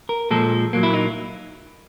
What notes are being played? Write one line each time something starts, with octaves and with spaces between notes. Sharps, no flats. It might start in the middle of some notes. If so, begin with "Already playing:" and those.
A#4
A#2 F3 G#3 A4
A#2 F#3 A#3
E4
D#4